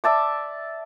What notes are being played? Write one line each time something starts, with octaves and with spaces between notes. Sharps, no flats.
D5 E5 A5 D6